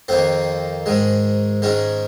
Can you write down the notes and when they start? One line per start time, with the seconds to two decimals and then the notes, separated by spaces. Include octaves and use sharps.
0.08 F2 D#3 A#3 C4
0.86 G#2 D#3 G#3
1.62 G#2 D#3 G#3 C#4